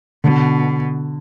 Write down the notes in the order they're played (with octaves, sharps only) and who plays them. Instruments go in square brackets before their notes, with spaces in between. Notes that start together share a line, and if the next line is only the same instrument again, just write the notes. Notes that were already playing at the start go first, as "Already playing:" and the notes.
[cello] B2 [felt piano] D3